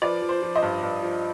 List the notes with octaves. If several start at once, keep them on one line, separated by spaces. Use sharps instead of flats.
F3 B4 D5
F3
C5
F3
C5 D#5
G2
G2
F3